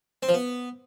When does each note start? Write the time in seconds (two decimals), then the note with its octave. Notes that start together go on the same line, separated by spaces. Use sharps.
0.23 C4
0.28 F3
0.34 B3